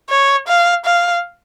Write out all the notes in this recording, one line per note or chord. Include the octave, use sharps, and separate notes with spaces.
C#5
F5
F5